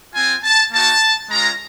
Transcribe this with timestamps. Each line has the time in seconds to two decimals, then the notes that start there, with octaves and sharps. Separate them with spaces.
0.14 C4 F4 G#5
0.43 A5
0.72 A#3 D#4 F#4 A5
1.30 G#3 C#4 F4 A#5